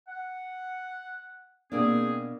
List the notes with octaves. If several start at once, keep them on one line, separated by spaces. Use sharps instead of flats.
F#5
B2 A#3 C4 D4 G#4